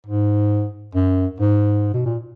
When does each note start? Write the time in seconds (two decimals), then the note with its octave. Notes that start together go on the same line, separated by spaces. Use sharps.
0.07 G#2
0.95 F#2
1.40 G#2
1.94 B2
2.06 A#2